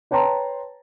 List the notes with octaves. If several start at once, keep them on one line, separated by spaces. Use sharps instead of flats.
B4 C#5 G5 A5 A#5 C6